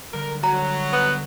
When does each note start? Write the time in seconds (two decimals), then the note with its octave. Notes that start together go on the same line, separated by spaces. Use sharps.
0.13 D3 G3 A#4
0.44 F#3 A#5
0.93 B3